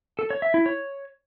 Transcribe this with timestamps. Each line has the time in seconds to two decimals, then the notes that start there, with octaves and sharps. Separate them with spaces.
0.19 A4
0.30 C#5
0.42 E5
0.54 E4
0.66 C#5